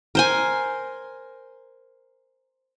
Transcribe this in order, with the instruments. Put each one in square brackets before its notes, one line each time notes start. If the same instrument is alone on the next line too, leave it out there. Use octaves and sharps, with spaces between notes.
[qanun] A#4 C5 G#5